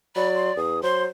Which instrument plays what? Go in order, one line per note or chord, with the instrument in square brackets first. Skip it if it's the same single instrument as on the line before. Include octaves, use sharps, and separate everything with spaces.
[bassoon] F#3 [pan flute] D5 [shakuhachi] B5
[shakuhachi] C6
[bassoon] E2 [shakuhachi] D#6
[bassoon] F#3 [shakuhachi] C5 [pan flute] C6